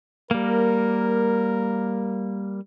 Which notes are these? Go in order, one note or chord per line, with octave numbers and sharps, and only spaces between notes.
G3 A#3 A#4